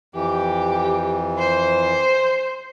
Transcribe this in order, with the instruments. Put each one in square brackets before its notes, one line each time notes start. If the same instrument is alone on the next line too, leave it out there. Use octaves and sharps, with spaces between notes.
[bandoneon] F2 E3 [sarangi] G4
[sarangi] C5